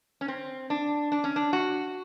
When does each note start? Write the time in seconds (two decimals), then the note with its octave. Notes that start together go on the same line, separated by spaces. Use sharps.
0.21 C#4
0.28 C4
0.70 D4
1.12 D4
1.24 C#4
1.36 D4
1.53 F#4